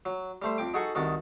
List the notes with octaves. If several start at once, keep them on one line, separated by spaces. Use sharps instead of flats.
F#3
G3 A3 C5
F2 G5 D6
D#4 F#4 G#4 A4 F#5 C#6
C2 D#3 F#4 A5